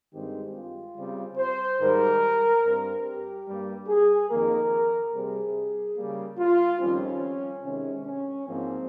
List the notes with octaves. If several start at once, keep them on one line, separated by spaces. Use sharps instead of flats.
G2 D#3 G#3 C4 G4
F4
C#3 G3 C4
C5
G#2 D#3 G3 A#4
G2 G3 C4
G4
G2 G3 A#3
G#4
F2 D#3 A#3 A#4
C3 G3 C4 G#4
C#3 G3 A#3
F4
F2 D#3 G3 C4 C#4
C3 D#3 G#3 C#4
C#4
G#2 F3 A#3 C4